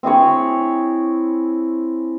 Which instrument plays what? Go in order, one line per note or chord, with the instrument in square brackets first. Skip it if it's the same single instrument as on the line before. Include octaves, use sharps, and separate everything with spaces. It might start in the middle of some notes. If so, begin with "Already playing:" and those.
[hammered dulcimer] C4 E4 G#4 C#5